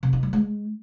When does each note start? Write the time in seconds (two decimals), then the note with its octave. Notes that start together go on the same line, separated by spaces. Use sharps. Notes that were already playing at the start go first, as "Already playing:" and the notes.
0.03 C3
0.13 D#4
0.23 G3
0.33 G#3